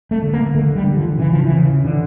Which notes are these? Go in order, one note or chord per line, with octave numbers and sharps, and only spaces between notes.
A3
D3
A#3
D3 A3
G3
D3
F3
C#3 E3
F3
E3
C#3
D3 E3